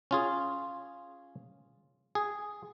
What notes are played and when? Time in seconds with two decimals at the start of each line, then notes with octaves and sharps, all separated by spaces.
0.11 C#4 F4 G#4
2.15 G#4